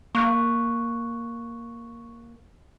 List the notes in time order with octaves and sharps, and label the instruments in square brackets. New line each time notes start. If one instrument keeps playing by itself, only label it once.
[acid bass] A#3 [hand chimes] C#6 F#6